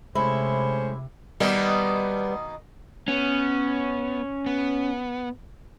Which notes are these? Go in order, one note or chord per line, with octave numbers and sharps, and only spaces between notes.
C3 G#3 A3 C#4 E4 C5
B2 D#3 G3 A#3 B3
B3 C#4
B3